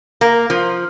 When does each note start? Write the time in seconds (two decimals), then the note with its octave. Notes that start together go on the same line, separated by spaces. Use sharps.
0.21 A#3
0.50 F3